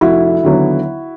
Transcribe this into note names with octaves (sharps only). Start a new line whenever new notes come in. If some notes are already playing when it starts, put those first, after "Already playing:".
F1 E4 F#4
D#2 D3 F#3 B3